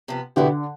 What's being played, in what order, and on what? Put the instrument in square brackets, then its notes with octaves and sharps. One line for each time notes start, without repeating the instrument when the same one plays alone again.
[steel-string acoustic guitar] C3 F3 B3
[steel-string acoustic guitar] E2 B2 B3 E4 G4 [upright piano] D3